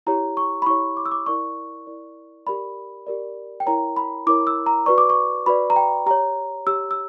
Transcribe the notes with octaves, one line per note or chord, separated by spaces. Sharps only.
E4 G4 C#5 A#5
C#6
B5
E4 G4 C#5 C#6
D6
E6
D6
E4 A#4 D5 C#6
E4 A#4 D5
G4 A#4 D5 B5
G4 A#4 D5
G5
E4 A#4 C#5 A#5
B5
E4 A#4 C#5 D6
E6
A#5
F#4 B4 D5 C#6
D6
C#6
F#4 B4 D5 B5
A#5
G5
G4 C#5 A#5
G4 C#5 E6
E6